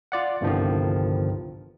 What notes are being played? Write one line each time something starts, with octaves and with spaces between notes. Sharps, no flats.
F4 D5 F#5
G1 C2 G2 D3 D#3 F3